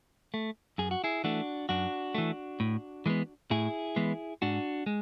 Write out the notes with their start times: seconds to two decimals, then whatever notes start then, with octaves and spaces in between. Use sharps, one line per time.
0.34 A3
0.78 F#2 G#4
0.91 F#4
1.04 E4 G#4
1.24 E3 A3 D4 F#4
1.69 F#2 D4 F#4
2.15 E3 A3
2.60 A2
3.06 E3 G#3 B3
3.51 A2 E4 G#4
3.96 E3 G#3 B3
4.42 G#2 D4 F#4
4.86 G#3